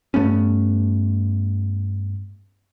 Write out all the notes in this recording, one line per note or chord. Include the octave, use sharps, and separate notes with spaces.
G2 A3 B3 C#4